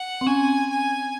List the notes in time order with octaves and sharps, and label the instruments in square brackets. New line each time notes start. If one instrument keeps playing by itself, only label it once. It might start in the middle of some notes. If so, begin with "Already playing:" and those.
Already playing: [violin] F#5
[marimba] C4
[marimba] C#4 [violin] G#5
[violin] G#5